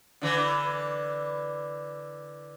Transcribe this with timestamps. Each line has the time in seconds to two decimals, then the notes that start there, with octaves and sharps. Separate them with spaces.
0.22 D3 E3